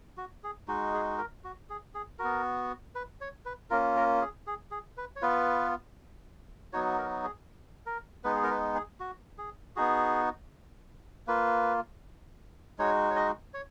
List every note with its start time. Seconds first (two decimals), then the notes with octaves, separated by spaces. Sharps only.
0.17 F#4
0.43 G#4
0.68 G#3 D#4 F#4
0.94 G#4
1.18 A#4
1.44 F#4
1.70 G#4
1.95 G#4
2.19 B3 F#4 A#4
2.95 B4
3.21 C#5
3.46 B4
3.70 A#3 C#4 F4 A#4
3.97 A#4
4.21 G#4
4.47 G#4
4.71 G#4
4.97 B4
5.16 C#5
5.22 B3 F4 B4
6.73 F#3 B3 D#4 F#4 C#5
6.98 A#4
7.24 G#4
7.86 A#4
8.24 G#3 B3 D#4 B4
8.36 G#4
8.43 A#4
8.51 B4
8.75 G#4
9.00 F#4
9.38 G#4
9.76 B3 D#4 F#4 G#4
11.27 A#3 F4 B4
12.79 G#3 D#4 F#4 C#5
13.11 C#5
13.16 D#5
13.54 C#5